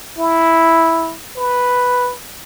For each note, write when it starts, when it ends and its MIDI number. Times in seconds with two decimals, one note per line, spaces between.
0.18 1.15 64
1.37 2.14 71